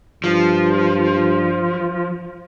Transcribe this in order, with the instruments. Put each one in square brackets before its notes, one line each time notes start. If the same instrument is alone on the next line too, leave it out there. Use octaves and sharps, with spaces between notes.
[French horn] G2 [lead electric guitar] F3